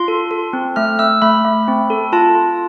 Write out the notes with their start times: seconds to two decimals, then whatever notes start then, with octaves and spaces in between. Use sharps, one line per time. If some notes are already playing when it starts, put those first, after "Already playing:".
Already playing: F4 C6
0.08 A4
0.31 A4
0.53 C4
0.76 A3 F6
0.99 A3 E6
1.22 A3 B5
1.45 A3
1.68 C4
1.90 A4
2.12 F4 A5
2.35 F4